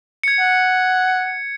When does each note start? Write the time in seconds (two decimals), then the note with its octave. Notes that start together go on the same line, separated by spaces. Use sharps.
0.23 G#6 C#7
0.39 F#5